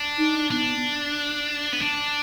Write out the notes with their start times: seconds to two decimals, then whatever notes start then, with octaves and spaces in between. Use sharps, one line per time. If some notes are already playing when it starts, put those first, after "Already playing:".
Already playing: D4
0.18 D#4
0.51 B3 D4
1.73 B3
1.82 D4